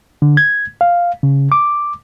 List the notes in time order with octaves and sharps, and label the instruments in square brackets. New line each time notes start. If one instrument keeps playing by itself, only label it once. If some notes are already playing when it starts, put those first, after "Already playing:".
[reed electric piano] D3
G#6
F5
C#3
D6